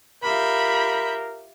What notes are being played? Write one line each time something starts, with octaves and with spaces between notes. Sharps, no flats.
F4 G4 A#4 E5 B5 G6